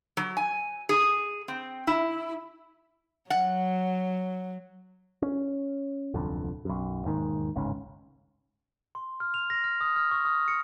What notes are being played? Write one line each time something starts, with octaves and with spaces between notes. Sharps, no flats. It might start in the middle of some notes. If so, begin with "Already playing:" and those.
F#3
G#5
G#4
C4
E4
F#3 F#5
C#4
D1 C2 F2 D3
B1 F#2
E1 D#2 G#2 D#3
G1 C#2 G#2 C#4
C6
F6
F7
A#6
F6
D#6
F6
C#6
D#6
C#7